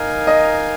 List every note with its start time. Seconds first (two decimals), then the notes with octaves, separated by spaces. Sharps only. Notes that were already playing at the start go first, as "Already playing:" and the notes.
Already playing: D#4 A#4 F5 G#5
0.27 D#5